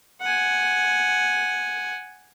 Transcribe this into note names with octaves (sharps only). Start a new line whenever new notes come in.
F#5 G#5